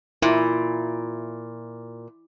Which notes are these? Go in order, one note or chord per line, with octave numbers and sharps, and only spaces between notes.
A#2 E4